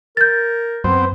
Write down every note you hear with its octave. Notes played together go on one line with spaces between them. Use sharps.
A#4 G6 A6
F#2 B3 C4 C5